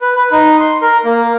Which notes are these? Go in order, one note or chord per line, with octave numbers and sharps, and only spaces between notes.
B4
B4
D#4
C6
A#4
A#3